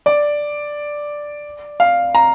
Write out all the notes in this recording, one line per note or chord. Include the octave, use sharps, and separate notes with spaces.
D5
F5
A#5